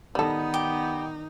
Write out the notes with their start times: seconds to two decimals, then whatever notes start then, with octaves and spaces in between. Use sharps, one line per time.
0.15 D#3 G3 B3 D#4 A4
0.54 G4